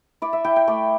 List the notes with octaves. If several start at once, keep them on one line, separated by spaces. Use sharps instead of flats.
E4 D5
E5
E4 G5
G5
A3 D5